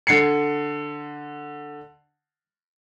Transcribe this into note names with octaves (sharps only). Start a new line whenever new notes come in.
D3 G#6 C7 C#7